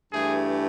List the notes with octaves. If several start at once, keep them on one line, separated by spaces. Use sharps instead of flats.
G2 E3 A3 G#4